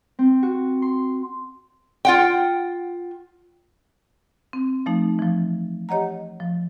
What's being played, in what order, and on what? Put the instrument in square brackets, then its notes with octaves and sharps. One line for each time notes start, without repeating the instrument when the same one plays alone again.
[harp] C4
F#4
C6
[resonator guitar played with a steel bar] F4 F#5 G5
[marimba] C4
F3 A3 D#4
E3 F3
G4 C#5 D#5 F#5 A#5
F3